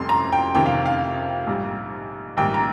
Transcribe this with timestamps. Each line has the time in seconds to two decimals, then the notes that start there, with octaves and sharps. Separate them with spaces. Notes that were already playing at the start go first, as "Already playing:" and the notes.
Already playing: F1 F2 C3 G3 C6
0.09 A#5
0.32 G5
0.55 F2 C3 D#3 G5
0.66 F5
0.86 F5
1.46 A#1 G#2 G3
2.37 A#1 G#2 D#3 G3 G5
2.54 A#5